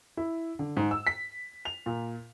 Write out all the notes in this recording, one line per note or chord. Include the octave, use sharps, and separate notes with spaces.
E4
D3
G#2
E6
B6
F7
A#2